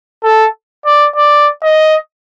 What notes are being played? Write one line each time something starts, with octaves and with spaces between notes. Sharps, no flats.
A4
D5
D5
D#5